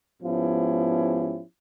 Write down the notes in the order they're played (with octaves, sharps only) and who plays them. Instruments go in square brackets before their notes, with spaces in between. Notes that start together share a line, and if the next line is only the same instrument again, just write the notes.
[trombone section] G#2 F3 B3 C#4 E4 G4